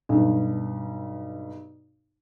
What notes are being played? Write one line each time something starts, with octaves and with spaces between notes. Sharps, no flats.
B1 G2